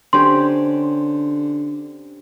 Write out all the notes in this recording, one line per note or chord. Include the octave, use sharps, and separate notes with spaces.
D3 C4 C#4 G4 C6